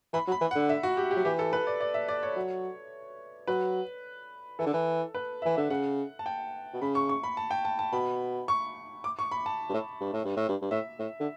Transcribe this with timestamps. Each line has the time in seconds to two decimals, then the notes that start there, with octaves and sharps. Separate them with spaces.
0.13 E3 B5
0.27 F#3
0.32 B5
0.41 E3
0.51 F#5
0.55 D3
0.69 E5
0.83 F#4
0.97 G4
1.11 G4
1.16 F#3
1.25 E3 G4
1.39 A4
1.53 B4
1.67 D5
1.81 D5
1.94 E5
2.08 D5
2.23 C#5
2.36 F#3
3.47 F#3 B4
4.59 E3 A4
4.66 D3
4.74 E3
5.15 B4
5.42 E5
5.45 E3
5.56 D3 E5
5.70 C#3 F#5
6.19 A5
6.26 G5
6.73 B2
6.81 C#3 B5
6.95 C#6
7.09 C#6
7.23 B5
7.37 A5
7.51 G5
7.65 A5
7.79 A5
7.93 B2 B5
8.48 C#6
9.04 D6
9.19 C#6
9.32 B5
9.46 A5
9.69 G2
9.74 A2
10.01 G2
10.13 A2
10.25 G2
10.37 A2
10.49 G2
10.62 G2
10.71 A2 E5
10.99 A2
11.20 D3